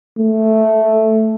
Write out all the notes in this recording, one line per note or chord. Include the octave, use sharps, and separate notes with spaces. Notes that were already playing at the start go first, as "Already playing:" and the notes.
A3